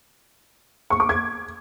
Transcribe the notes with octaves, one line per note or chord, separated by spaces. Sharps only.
C#6
D6
G#6